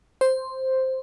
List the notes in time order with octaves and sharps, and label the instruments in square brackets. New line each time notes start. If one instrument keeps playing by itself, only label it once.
[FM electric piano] C5